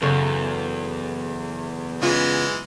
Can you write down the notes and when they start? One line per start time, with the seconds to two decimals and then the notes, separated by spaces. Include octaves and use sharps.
0.02 F#1 E2 A4 A#4 C#5 C7
2.02 C#3 E3 G#3 B3 C#4 F4